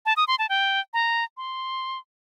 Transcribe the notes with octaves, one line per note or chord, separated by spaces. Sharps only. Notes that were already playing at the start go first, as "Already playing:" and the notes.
A5
D#6
C6
A5
G5
A#5
C6